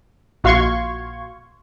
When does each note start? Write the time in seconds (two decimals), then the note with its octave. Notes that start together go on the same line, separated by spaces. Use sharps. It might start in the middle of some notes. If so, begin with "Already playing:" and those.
0.44 A#1 F#4 F5 C6 C#6 G#6